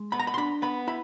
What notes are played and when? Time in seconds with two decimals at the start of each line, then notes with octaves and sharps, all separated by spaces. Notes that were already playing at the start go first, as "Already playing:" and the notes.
Already playing: G#3
0.12 B3 B5
0.19 A#5
0.27 B5
0.34 C6
0.37 D4 B5
0.62 B3 B5
0.88 E4 B5